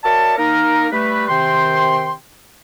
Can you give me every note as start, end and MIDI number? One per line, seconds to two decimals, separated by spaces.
0.04 0.35 66
0.04 0.35 70
0.04 0.35 73
0.04 0.35 74
0.04 0.35 76
0.04 0.35 81
0.38 0.87 58
0.38 0.87 63
0.38 0.87 70
0.92 1.25 55
0.92 1.25 57
0.92 1.25 71
1.28 2.12 48
1.28 2.12 51
1.28 2.12 79
1.28 2.12 84